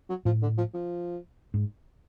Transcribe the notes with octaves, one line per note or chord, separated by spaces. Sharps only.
F#3
A2 F3
D3
F3
F3
G#2